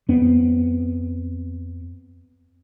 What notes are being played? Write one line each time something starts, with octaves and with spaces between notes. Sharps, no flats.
F2 B3 C4